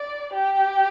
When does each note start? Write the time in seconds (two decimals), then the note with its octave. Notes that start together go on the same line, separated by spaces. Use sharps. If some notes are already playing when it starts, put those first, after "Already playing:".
Already playing: D5
0.34 G4